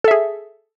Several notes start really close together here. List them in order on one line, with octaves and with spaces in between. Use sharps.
A4 E5 G#4